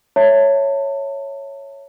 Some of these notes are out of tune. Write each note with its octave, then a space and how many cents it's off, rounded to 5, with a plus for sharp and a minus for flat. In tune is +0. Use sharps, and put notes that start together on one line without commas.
C#5 +0 E5 +5 A5 +35